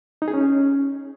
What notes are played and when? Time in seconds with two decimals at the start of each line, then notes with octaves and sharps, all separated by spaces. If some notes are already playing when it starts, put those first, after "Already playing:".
0.22 D#4
0.28 G#4
0.33 C#4